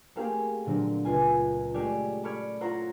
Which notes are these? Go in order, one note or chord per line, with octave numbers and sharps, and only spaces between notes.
A3 A#3 C4 G4 G#4 F5
A#2 D3 F#3 C4
C#2 F4 G#5
G#3 A3 C#4 G4 D5 G#5
A4 D5 B5 C#6 F6 G#6
E4 F4 C5 C#5 F#5 A#5